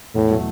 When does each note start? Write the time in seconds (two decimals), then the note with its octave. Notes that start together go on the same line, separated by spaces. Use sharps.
0.15 E2 A2
0.29 B2 F#3 A3